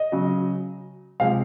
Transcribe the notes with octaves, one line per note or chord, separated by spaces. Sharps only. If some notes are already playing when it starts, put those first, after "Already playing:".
Already playing: D#5
C#3 F#3
C3 F3 G#3 F5